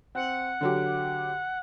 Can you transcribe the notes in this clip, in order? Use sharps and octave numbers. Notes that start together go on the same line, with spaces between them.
C4 F#5
D3 F#3 G4